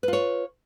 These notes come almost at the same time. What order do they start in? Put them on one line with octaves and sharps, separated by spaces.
B4 F4 C#5